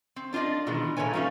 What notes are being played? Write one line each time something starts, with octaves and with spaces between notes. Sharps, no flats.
C4
D4 F4 C5 D5 D#5
B2 D#3 E3 G#3 B3
A#2 A3 B4 C#5 G#5
F3 G3 A3 C#4 D#4 F4